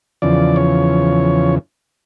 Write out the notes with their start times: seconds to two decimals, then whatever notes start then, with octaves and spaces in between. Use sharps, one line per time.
0.22 E2 C#3 F3 D5
0.56 C#5